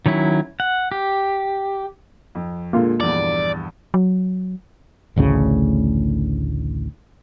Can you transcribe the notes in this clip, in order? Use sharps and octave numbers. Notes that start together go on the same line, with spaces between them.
D#3 F#3 C#4 E4
F#5
G4
F2
A#2 D3 G#3 A#3 F4
A#1 E2 G2 D5
F#3
A1 D2 A2 C#3